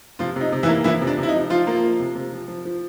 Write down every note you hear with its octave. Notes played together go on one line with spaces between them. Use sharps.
C3 F3 F4
C3 D#4
C3
E3 E4
A#3
E3 F3 E4
C3
D4
C3
E4
D#4
F3
F3 F4
A#3
F3
C3
C3
F3
F3
F3